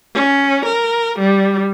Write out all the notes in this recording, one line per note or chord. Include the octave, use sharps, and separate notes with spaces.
C#4
A#4
G3